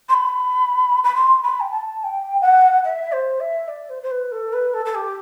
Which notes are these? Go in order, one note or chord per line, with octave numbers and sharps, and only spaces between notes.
C6
B5
B5
C6
B5
G5
A5
A5
G5
F#5
E5
C5
E5
D5
C5
C5
B4
A4
B4
A4
A4
G4